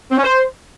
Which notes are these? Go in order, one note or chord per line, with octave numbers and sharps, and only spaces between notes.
C4
C#4
C5